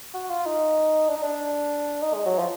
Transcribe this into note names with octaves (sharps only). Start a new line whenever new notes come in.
F#4
F4
D#4
D4
D#4
D4
D#4
G#3
F#3
F3